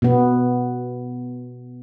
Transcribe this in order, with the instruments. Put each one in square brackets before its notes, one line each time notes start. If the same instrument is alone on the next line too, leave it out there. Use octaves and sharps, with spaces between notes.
[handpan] B2 B3